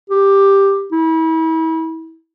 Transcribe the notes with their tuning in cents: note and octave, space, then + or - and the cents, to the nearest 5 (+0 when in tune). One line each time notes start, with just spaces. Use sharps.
G4 +5
E4 -35